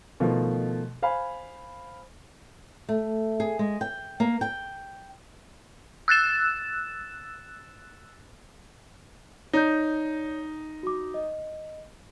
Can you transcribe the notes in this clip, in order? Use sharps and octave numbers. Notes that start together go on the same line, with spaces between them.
B2 D#3 F3 A3
C5 F5 G#5 B5
A3
G#4
G#3
G5
A#3
G5
E6 F#6 A6 E7
D#4 C#5 D5 G6
F#4 D6
D#5